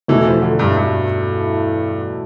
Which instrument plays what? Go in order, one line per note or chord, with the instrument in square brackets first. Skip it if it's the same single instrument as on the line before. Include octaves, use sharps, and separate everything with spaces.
[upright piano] E2 B2 A3 E4 [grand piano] E3
[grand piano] F3
D3
G2
G2